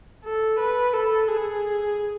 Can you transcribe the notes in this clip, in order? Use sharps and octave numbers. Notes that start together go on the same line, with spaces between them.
A4
B4
A4
G#4